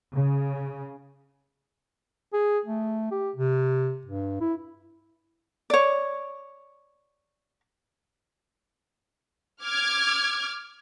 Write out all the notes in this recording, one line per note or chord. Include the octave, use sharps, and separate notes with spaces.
C#3
G#4
A3
G4
C3
G2
E4
C#5 D5
D6 F6 G#6